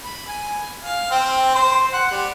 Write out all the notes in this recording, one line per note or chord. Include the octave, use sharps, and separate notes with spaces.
B5
G#5
F5
C4
C5
F#5
G3